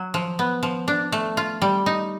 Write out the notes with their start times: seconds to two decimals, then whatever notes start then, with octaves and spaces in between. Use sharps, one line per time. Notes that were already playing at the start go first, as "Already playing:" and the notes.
Already playing: F#3
0.14 F3
0.39 B3
0.63 F3
0.88 D4
1.12 A3
1.37 F4
1.62 G3
1.86 D#4